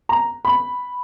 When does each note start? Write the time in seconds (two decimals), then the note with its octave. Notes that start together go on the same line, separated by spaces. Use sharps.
0.09 A#5
0.45 B5